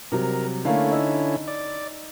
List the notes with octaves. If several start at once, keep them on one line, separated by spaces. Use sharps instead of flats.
C3 F#3 G3 A#4
D3 A3 A#3 C#4 E4 F5
D#4 E6
D5